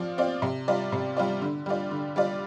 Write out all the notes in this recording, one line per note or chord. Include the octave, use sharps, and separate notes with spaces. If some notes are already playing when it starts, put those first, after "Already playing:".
Already playing: F3 C4 F4 D5
C4 F4 D5
C3
G3 F4 D5
C3
G3 F4 D5
D3
G3 F4 D5
D3
G3 F4 D5